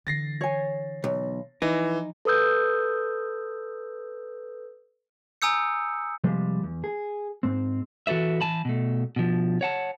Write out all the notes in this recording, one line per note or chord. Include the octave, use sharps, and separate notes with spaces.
D3 E3 A6 A#6 C7
C#5 G#5
B1
E3 F3 D#4
A4 B4 D#6 E6 G6
G#5 A#5 D#6 E6 G6 C#7
C3 F3 G3 G#3
E2
G#4
G#2 C4
E3 F#4 A4 B4 E5
E3 G#5 A5 B5
B2 A3
B2 F3
C#5 F#5 A5